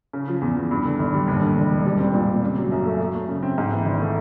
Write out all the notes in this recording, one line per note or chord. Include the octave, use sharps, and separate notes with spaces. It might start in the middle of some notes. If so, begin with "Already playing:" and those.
C#3
F3
E2
E2
G2
D3
G#1
G3
D#2
D3
E1
E1
G3
C4
A#2
A#2
C#3
F#3
F#2
A3
F#3
A3
C#3
C4
G#2
E3
G#1
A3